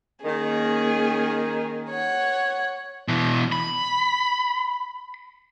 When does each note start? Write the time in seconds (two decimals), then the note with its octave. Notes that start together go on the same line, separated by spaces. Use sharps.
0.25 D#3 A#3 C#4 G#4
1.89 C#5 F#5
3.08 B2 E3
3.52 B5